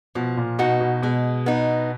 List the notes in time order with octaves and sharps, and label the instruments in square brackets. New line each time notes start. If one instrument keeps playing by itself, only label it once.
[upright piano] B2 [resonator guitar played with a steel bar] F3
[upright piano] A#2
[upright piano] B2 [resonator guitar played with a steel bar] B3 D#4 F#4
[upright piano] B2
[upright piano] B2 [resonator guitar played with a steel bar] G#3
[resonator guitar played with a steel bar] B3 D#4